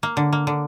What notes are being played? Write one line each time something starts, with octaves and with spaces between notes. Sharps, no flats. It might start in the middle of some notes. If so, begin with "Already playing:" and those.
A#3
D3
A#3
D3